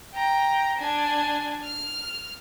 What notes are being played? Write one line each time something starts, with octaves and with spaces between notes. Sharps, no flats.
G5 A#5
D4 G#5
F6